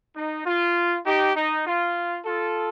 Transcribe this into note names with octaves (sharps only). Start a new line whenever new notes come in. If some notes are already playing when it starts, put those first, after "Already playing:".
D#4
F4
D#4 G4
D#4
F4
F4 A4